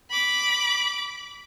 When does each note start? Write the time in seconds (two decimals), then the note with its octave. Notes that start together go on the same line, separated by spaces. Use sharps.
0.10 B5 D6